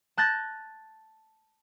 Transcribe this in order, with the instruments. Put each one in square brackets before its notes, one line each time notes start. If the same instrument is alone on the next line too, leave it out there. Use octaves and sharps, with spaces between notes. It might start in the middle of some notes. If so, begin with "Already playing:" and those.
[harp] A5 F#6 G6 A6 A#6